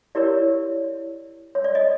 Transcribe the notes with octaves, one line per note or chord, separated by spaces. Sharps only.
E4 G4 A#4 C#5 D5
C#5
D5
D#5